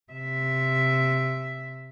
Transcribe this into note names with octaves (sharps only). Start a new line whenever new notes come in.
C3 E5